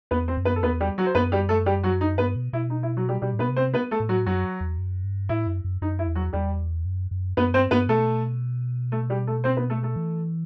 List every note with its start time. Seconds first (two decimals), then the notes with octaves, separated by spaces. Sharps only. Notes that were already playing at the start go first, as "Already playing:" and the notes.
0.11 E2 B3 B4
0.28 C4 C5
0.37 F#2
0.45 B3 B4
0.56 A4
0.63 E2 B3 B4
0.80 G3 G4
0.98 F#3 F#4
1.06 C5
1.15 F#2 B3 B4
1.32 G3 G4
1.49 A3 A4
1.66 G3 G4
1.83 F#3 F#4
2.01 D#4
2.18 G2 B3 B4
2.36 B2
2.53 B2 E4
2.70 D#4
2.83 E4
2.97 F#3 F#4
3.09 G3 G4
3.22 B2 G3 G4
3.34 A2
3.39 B2 B3 B4
3.49 C3
3.56 C4 C5
3.74 B3 B4
3.91 A3 A4
4.00 A2
4.09 F#3 F#4
4.26 F#2 F#3 F#4
4.61 E2
4.78 F#2
5.04 G2
5.29 A2 E4
5.47 F#2
5.64 F#2
5.82 F#2 D#4
5.99 E4
6.07 E2
6.15 F#3 F#4
6.33 E2 G3 G4
6.85 F#2
7.11 F#2
7.37 F#2 B3 B4
7.54 G2 C4 C5
7.71 G2 B3 B4
7.89 B2 A3 A4
8.92 A3 A4
9.10 G3 G4
9.27 A3 A4
9.44 C4 C5
9.57 B3 B4
9.70 A3 A4
9.83 A3 A4
9.96 E3